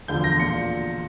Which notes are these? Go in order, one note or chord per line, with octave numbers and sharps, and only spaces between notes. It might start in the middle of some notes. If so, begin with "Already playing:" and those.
E1 D2 D3 F3 G6
A#6
A#2 C#7